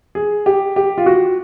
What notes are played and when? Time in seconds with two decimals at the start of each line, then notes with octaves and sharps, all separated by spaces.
0.15 G#4
0.46 G4
0.76 G4
0.98 F4
1.06 F#4